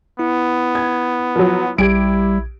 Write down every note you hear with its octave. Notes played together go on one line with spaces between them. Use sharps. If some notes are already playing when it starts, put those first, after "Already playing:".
B3 E4
G#6
F3 F#3
A#1 G3 E4 G4 G#6 D7